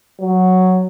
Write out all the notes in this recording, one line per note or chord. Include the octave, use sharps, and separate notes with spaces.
F#3